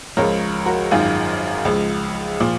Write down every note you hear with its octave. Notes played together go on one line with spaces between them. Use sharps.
C#2 C#3 F3 A#4 C#5
F#4 A#4
G#1 F#2 D#3 F4 G#4
C#2 C#3 F3
A#2 F3